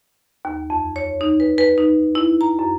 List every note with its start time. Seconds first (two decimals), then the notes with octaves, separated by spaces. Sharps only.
0.45 D#2
0.70 F2
0.96 C#5
1.21 D#4
1.40 B4
1.58 B4
1.78 D#4
2.15 E4
2.41 A#5
2.59 F#2